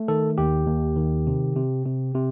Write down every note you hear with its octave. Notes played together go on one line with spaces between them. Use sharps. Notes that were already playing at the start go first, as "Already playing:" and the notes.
Already playing: A3
D#3 A4
D#2 G4
D#2
D#3
C3
C3
C3
C3